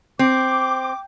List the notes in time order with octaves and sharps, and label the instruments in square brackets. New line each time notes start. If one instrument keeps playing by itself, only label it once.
[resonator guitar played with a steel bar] C4 [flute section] D6